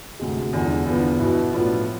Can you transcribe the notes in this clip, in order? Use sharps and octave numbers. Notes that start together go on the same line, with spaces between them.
D2 C3 G#3
E2 D3 F3 G#3
E2 D3 F3 B3 F4
B2 B3 E4
A2 F3 B3 D4 F4